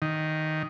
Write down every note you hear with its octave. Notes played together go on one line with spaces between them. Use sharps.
D#3